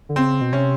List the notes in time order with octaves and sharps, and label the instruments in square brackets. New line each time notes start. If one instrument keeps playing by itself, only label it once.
[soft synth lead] D3
[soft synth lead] C#3 [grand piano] C4
[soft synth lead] B2
[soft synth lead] C3 [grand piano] C#4